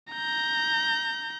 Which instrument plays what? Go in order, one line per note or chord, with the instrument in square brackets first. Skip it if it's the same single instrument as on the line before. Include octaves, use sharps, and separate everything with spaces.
[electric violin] A#5 G6